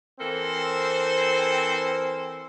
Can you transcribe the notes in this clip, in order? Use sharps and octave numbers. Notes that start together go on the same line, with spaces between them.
E3 C4 A4 A#4 C5